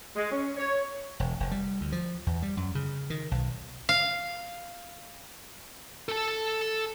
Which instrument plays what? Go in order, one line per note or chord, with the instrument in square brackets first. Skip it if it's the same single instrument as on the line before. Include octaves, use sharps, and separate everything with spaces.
[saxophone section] G#3
C#4
C#5
[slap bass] E1
F1
G3
D2
F3
E2
G3
F#2
C#3
D#3
B1
[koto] F5
[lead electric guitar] A4 A5